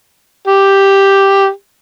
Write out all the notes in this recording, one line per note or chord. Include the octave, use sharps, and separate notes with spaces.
G4